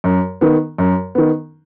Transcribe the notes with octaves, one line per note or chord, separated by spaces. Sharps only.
F#2
D#3 B3
F#2
D#3 B3